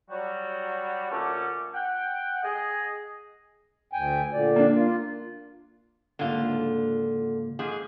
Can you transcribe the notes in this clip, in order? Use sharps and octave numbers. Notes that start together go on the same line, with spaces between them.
F#3 G3 F#4
A#2 D3 A3 C#4 F#5 D6
F#5 G5
G#4 D#5
D2 G5 G#5
A#2 D3 D5
A#3 D4
F4
C#2 G#2 D3 A#3 F4
G#2 F3 G#4